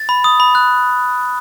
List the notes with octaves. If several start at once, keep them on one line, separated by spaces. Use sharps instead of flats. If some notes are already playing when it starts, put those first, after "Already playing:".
Already playing: A6
B5
D#6
B5
F#6